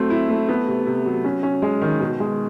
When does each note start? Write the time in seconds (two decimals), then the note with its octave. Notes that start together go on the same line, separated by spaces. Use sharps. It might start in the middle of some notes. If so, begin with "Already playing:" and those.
Already playing: F#3 A3 C4
0.10 E4
0.30 A3
0.49 B3
0.67 C3
0.86 C3
1.05 F#3
1.24 C#4
1.43 C#4
1.62 G#3
1.81 D#3
2.00 B2
2.20 G#3